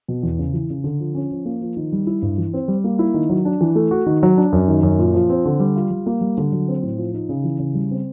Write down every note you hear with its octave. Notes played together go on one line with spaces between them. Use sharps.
B2
E2
C#3
E3
C#3
D3
F3
C#4
F3
A#3
F3
D#3
G3
E4
G2
E3
C4
G3
A#3
E4
D#3
F#3
D4
E3
A3
F#4
D#3
F#3
D4
F#2
D#3
F#2
A#2
F3
C4
D3
G3
F4
G3
A#3
G3
D3
F#3
C4
A2
F3
D#4
C#3
E3
C#3
G3
C4